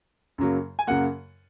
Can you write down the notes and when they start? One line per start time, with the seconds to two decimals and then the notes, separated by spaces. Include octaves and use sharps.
0.38 F#2 C#3 F#3 A#3
0.79 G#5
0.87 F#2 C#3 F#3 A#3 F#5